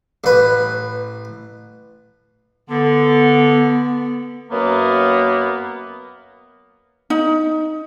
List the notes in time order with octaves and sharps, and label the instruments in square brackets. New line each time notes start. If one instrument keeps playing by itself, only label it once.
[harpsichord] A1 B4
[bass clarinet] D3 [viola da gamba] B3
[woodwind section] F#2 A#3 B3
[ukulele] D#4